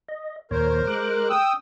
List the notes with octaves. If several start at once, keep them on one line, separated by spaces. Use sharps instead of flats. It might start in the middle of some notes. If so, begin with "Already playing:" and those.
D#5
D#2 A#2 A#4 C5 C#5
G#3 D6 F#6
G5 D#6 E6